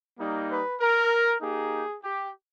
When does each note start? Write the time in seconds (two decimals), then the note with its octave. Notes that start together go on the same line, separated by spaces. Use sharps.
0.19 G3 A#3 D#4
0.49 B4
0.80 A#4
1.41 A#3 D#4 G4 G#4
2.02 G4